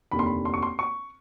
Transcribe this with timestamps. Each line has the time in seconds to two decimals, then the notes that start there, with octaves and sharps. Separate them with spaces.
0.11 F1 D#2 D3 B5
0.19 C6
0.26 B5
0.45 C6
0.54 C#6
0.63 C6
0.79 C#6